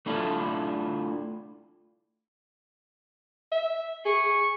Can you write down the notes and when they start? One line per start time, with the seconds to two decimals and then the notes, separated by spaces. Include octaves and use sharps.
0.06 A3 D4 E4 F4
3.52 E5
4.05 G#4 C#6